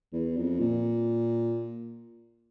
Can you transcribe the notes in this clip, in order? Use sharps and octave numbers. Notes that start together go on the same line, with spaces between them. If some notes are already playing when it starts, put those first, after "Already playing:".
E2
F2
A#2